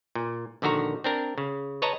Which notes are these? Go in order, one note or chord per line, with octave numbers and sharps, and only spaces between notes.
A#2
A#1 D3 D#3 F#4 A#5
C4 D4 A#4
C#3
B4 C#5 D#5 A5 A#5